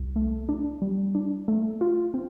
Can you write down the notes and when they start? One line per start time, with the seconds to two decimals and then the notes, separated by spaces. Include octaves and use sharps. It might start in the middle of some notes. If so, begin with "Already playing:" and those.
Already playing: C2
0.16 A3
0.49 D4
0.82 G3
1.15 D4
1.48 A3
1.81 F4
2.14 C4